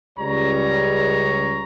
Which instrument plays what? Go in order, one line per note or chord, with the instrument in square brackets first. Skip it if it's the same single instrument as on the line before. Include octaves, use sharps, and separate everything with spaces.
[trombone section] C#2 G3 [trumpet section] C#5 A#5